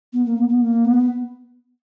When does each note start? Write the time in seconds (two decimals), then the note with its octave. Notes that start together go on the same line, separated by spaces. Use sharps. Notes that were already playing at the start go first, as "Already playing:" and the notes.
0.13 B3
0.26 A#3
0.38 B3
0.49 B3
0.62 A#3
0.85 B3